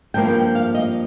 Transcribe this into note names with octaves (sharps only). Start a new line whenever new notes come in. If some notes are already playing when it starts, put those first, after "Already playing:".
G2 F3 A#3 G5
G5
F5
D#5